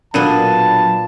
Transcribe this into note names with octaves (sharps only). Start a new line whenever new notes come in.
B1 A#2 F#3 B3 D4 A4 A5 D#7